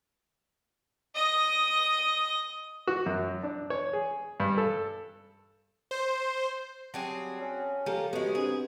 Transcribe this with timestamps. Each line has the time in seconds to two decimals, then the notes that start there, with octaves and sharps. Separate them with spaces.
1.15 D#5 D#6
2.87 F#4
3.06 F#2
3.43 D4
3.70 C#5
3.93 G#4
4.40 G2
4.57 A4
5.91 C5
6.94 F#3 G3 C4 G#4 A5
7.41 C#4
7.86 F3 G4 A4 A#4
8.13 G#3 B3 C#4 F#4 G4
8.35 G#2 C4 D4 G4 G#4